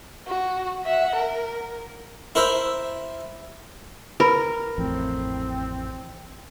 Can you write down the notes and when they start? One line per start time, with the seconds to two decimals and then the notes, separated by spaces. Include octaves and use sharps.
0.27 F#4
0.85 E5 F#5
1.16 A#4
2.35 E4 A#4 C5 E5
4.20 A#4 B4 B5
4.78 A1 F2 A2 C4